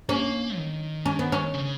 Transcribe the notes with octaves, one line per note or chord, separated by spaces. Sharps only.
A#3 C#4
D#3
C#4
B3
C#4
C#3